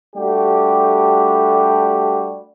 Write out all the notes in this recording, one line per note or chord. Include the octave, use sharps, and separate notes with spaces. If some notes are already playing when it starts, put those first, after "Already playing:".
G3 A3 D4 F#4 G4